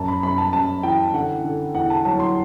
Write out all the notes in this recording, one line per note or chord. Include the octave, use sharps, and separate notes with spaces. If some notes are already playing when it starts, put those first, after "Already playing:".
Already playing: F#2 A5
B5
F#2 B5
A5
F#2 A5
E3 G5
D3 F#5
D3
E2 F#5
A5
F#3 A5
C6